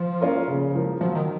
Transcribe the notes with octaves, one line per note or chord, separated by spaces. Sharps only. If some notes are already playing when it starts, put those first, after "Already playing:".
Already playing: F3
A#3 C#4 F4 A#4
C#3
F3 A#3
F3 F#3
D#3